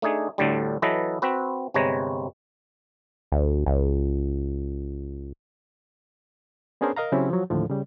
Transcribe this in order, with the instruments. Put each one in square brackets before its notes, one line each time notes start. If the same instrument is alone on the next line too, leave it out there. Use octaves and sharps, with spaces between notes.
[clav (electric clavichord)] A3 D4 D#4 G#4
D2 A2 D3 G3
E3 F#3 A4 B4 D#5
C4 F#4 B4
G1 C3 G#3 B4 C#5 A#5
[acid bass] D2
C#2
[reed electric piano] B3 C#4 D4 G#4 A#4 C5
A#4 D#5 F5 A#5
C#3 F#3 C4 C#4 E4 G4
F3 F#3
D#2 A2 D3 F3
C#3 G3